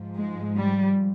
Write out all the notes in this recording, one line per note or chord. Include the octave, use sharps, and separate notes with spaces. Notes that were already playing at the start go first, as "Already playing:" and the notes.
Already playing: G#2 F3
G#3
G3